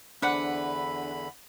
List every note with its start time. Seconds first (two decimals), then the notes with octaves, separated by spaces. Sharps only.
0.22 E2 D3 D4 B4 C5 D5 F#5 B5